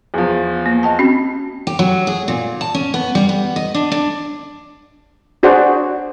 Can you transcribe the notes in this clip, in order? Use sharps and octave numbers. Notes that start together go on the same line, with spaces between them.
E2 F3
A#3
D#5 G5 A5
C4 C#4 F#4
G4
F#3
G#4
A#2
A5
C#4
B3
G3
B3
D#5
D4
D4
D4 F#4 G#4 C5 D5 F#5